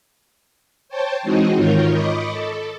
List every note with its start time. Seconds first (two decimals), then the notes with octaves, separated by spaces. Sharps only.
0.89 C5 C#5 G5 A5
1.23 E3 G#3 C4 D#4 F#4 D#5
1.53 G#2 D#3 F4 A#4 C#5 G6
1.90 D#5 B5 C#6 D6
2.30 A4